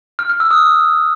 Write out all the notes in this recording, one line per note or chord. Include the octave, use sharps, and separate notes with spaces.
F6
F6
E6
D#6